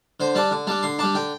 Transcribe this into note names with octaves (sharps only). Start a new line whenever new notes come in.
D3 C5
G3 D4 A5
D3
G3 D4 A5
D3 C6
G3 D4 A5
D3 G5